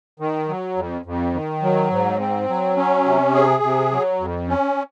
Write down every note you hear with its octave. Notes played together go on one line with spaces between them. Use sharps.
D#3
F#3
F2
F2
D#3
F#3
G#2
C4
F#3
C#4
C3
G#4
C3
F#3
F2
C#4